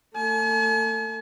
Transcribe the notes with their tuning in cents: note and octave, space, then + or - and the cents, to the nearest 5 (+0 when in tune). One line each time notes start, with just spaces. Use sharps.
A3 +35 G#5 +45